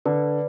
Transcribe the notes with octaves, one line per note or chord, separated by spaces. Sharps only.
D3 B4 D5